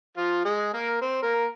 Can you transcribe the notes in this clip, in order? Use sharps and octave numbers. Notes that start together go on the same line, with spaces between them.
F3 F4
G#3 G#4
A#3 A#4
C4 C5
A#3 A#4